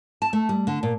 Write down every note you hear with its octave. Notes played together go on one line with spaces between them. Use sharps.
A5
A3
G3
D3
A#2